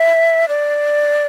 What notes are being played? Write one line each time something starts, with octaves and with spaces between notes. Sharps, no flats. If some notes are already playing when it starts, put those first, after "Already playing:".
Already playing: E5
D5